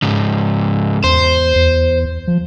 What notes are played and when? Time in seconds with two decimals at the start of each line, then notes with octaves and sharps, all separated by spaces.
0.02 C#2 G#2
1.04 E2 C5
1.56 E2
2.27 F3